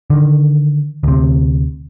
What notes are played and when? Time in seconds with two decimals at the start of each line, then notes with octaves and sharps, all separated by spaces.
0.10 D3 D#3
1.03 D2 C3